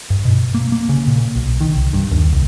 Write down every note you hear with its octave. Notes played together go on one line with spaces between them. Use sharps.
G2
B2
A#3
A#3
C#3
A#2
B1
D#3
C2
G2
D#2
C2